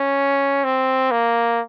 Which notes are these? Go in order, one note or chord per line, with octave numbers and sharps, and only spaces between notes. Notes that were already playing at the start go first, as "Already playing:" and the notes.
Already playing: C#4
C4
A#3